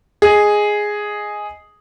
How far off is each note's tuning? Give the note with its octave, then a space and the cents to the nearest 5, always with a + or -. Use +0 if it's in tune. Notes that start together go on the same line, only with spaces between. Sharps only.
G#4 +0 D#5 +0